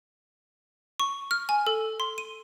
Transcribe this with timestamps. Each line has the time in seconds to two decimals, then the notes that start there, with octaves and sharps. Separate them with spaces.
1.00 C#6
1.31 F6
1.49 G#5
1.67 A4
2.00 C6
2.18 D#7